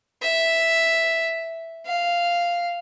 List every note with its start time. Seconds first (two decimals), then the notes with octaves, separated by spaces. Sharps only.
0.22 E5
1.86 F5